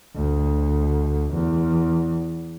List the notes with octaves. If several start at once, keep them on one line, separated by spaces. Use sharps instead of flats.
D2
E2